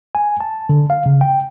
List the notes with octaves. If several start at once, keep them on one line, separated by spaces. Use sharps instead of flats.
G#5
A5
D3
F5
C#3
G5